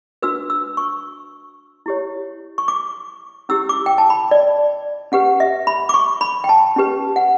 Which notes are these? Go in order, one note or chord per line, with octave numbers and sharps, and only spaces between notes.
D4 F#4 B4 E6
E6
C#6
E4 G4 C#5
C#6
D6
C#4 E4 G4 E6
D6
G5
A5
B5
D5
C#4 G4 B4 F#5
E5
B5
D6
C#6
B5
G5
A5
C#4 G4 B4
F#5